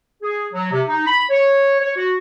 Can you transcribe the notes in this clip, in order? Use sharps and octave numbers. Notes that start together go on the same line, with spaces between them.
G#4
F#3
C3
D#4
B5
C#5
C#5
F#4